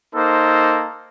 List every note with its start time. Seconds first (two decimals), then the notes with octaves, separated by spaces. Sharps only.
0.14 A#3 D#4 A4 C5